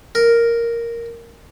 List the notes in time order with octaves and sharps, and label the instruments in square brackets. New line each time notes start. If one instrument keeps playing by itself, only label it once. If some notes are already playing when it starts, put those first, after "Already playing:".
[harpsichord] A#4